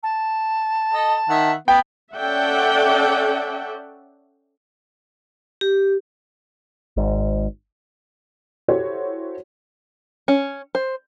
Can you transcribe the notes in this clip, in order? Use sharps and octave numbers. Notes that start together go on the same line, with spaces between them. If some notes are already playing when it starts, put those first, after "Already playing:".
A5
A4 D#5
D#3 E5 F#5
B3 G5
C#4 A4 D5 E5 F#5 G5
G4
G#1 G#2
E4 F#4 G4 A4 C5 C#5
C#4
C5